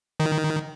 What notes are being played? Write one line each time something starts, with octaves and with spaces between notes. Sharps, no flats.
D#3